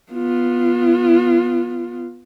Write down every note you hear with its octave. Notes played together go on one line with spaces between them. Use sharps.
B3 F4